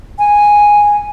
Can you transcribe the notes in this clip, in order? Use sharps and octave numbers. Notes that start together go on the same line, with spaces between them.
G#5